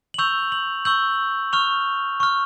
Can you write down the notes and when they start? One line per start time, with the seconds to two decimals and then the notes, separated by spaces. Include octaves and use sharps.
0.14 F#7
0.18 C#6 E6 G6 F7
0.52 F#7
0.85 C#6 E6 G6 F#7
1.53 C#6 F6 F7
2.20 C#6 F6